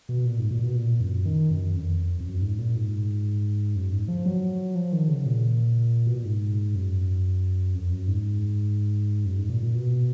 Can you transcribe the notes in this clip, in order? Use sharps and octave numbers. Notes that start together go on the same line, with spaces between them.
B2
A#2
G#2
A#2
B2
A#2
F#2
D#3
F#2
F2
F2
F#2
G#2
A#2
G#2
F#2
G#2
F3
F#3
F3
D#3
C#3
A#2
B2
A#2
G#2
F#2
F2
F#2
G#2
F#2
G#2
A#2
A#2
B2